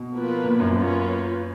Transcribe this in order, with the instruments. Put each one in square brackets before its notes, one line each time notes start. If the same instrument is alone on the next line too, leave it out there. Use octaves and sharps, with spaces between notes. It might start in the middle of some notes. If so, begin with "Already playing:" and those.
Already playing: [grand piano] B2
[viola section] F3 A#3 F4 B4
[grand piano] A#2
F#2
[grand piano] F#2 [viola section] A#3 C#4 F4 B4